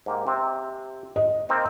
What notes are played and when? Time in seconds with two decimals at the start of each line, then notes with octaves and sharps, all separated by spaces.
0.06 G#2 A#3 G4
0.27 C3 C4
1.16 D#5
1.49 A#3 C4 D#4